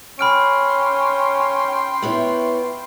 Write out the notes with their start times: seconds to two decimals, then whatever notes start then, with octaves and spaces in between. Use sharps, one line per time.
0.19 C#4 G5 B5 C6 F6 D7
2.02 B3 E4 C#5